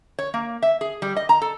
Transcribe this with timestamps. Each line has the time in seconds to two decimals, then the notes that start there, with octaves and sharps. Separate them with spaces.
0.19 C#5
0.34 A#3
0.62 E5
0.81 G#4
1.02 G3
1.17 D#5
1.29 A#5
1.42 A4